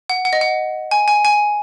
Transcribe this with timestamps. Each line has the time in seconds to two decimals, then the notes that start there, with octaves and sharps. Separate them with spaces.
0.10 F#5
0.25 F#5
0.33 D#5
0.41 F#5
0.91 G#5
1.08 G#5
1.25 G#5